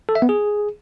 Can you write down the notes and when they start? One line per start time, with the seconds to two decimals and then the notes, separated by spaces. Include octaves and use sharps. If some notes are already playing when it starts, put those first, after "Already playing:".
0.09 A4
0.15 E5
0.22 B3
0.29 G#4